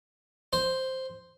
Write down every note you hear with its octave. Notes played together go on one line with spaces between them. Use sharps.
C5